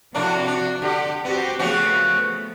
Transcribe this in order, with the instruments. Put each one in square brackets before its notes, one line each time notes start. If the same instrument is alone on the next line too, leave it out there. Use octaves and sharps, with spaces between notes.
[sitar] A2 A#3 D4 [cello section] C3 F3 F#4
[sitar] D4
[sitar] D3 [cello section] G4
[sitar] B3 [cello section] C4 F#4 G4
[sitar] C#3 C#4 F#4 [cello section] F3 A3 B3